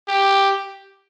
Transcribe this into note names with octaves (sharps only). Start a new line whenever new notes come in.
G4